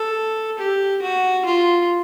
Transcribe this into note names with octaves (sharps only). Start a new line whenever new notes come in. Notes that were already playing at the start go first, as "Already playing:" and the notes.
Already playing: A4
G4
F#4
F4